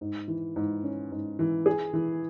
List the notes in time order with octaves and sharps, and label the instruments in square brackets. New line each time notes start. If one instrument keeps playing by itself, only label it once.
[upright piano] G#2
E3
G#2
C#4
G#2
E3
G#4
E3